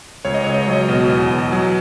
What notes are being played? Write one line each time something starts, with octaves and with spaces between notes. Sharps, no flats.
C#2 C#5
D#5
C#2 C#5
D#5
F#3 C#5
D#5
C#5
B2
E2 D#5
E2
F#3